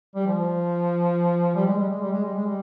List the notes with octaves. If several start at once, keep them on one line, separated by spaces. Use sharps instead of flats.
G3
F3
G3
G#3
G3
G#3
G3
G#3
G3
G#3
G3